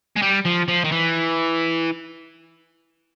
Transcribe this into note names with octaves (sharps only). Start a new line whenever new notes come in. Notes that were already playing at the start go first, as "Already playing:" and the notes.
G#3
G3
F3
F3
D#3
E3